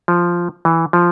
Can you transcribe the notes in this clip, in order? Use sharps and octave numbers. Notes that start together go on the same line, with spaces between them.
F3
E3
F3